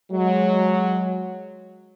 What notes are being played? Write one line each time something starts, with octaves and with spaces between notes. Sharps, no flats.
F#3 G#3